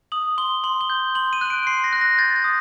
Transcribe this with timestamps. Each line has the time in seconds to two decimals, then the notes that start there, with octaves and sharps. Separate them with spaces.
0.12 D#6 F#7
0.38 C6 G7
0.64 C6 F#7
0.81 G7
0.90 G6
1.15 C6 F#7
1.33 D#7
1.41 F#6
1.50 D7
1.67 C6 C7
1.84 A#6
1.93 F#6
2.01 A#6
2.18 G6 A6
2.36 A6
2.44 D#6